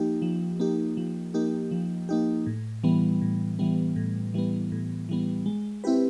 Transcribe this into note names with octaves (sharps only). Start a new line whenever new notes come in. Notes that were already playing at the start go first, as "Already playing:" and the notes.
Already playing: F3 A#3 D#4 G4
F3
A#3 D#4 G4
F3
A#3 D#4 G4
F3
A#3 D#4 G4
A2
E3 G3 B3
A2
E3 G3 B3
A2
E3 G3 B3
A2
E3 G3 B3
G#3
C4 E4 G4 B4